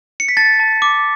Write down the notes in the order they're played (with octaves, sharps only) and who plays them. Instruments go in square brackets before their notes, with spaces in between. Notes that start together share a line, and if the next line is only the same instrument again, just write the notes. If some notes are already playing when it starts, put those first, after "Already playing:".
[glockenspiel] C#7
B6
A5 A6
A5
D6